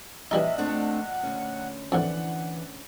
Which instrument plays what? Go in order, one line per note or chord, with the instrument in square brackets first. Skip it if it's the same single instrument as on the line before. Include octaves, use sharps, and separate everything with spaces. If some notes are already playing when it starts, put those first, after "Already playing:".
[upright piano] A#1 D#5 F#7 [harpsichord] E3 G3 D#4 [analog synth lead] E5
[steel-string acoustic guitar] A3 C4 D4 [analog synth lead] F#5
[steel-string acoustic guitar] D2 C#4
[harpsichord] F2 A2 [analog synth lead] E3 [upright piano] D4 F#5